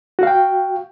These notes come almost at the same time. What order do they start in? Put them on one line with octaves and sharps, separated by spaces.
F#4 F5 G5